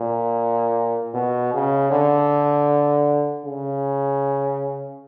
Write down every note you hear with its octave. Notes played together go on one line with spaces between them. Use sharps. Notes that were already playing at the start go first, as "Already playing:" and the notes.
Already playing: A#2
B2
C#3
D3
C#3